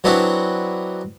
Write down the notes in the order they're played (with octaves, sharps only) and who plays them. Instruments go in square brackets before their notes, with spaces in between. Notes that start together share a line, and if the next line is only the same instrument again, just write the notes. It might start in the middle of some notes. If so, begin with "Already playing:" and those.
[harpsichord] F#3 B3 C4 D4 E4 F#4